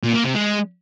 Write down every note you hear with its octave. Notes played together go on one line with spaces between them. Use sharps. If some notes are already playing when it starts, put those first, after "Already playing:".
A#2
A#3
C3
G#3